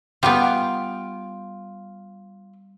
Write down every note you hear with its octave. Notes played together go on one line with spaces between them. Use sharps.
G3 B3 F4 G5